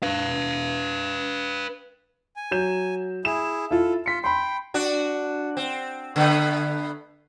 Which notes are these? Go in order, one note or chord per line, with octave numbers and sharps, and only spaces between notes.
B4 F5
G#5
F#3 G6 E7
E4 G#4 E7
E4 F4 A4
F4 B6 C#7
G5 B5 C6
D4 F#4
C4
D3 A3 B3